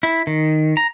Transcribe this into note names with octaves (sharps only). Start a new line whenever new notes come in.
E4
D#3
A#5